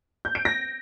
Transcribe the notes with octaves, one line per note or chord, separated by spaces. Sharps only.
G6
D7
A#6